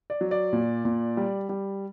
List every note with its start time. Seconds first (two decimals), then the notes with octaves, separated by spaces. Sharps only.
0.10 D5
0.21 F#3
0.31 D5
0.53 A#2
0.85 A#2
1.17 G3
1.49 G3